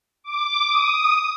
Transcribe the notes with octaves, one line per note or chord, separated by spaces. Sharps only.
D6
D#6